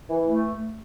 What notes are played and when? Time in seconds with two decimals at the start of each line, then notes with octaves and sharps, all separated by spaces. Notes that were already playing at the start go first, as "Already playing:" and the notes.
0.09 E3
0.26 A3